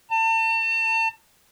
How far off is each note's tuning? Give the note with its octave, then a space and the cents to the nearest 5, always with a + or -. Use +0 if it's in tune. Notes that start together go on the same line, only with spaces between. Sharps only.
A5 +40